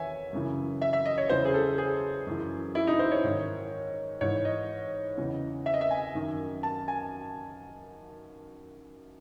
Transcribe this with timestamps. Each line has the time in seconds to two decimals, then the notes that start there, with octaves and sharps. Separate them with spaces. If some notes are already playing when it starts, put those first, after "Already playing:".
Already playing: E2 D#3 C#5 E5 G#5
0.33 F#2 C#3 E3
0.82 E5
0.93 E5
1.05 D#5
1.18 C#5
1.29 E2 C#3 E3 C5
1.45 G#4
1.54 A4
1.78 G#4
2.27 F#2 E3
2.75 E4
2.87 D#4
2.99 C5
3.12 C#5
3.24 G#2 D#3
4.21 G#2 E3 C#5
4.45 D#5
5.18 E2 C#3 E3
5.66 E5
5.74 D#5
5.81 E5
5.91 G#5
6.15 F#2 D#3
6.63 A5
6.88 G#5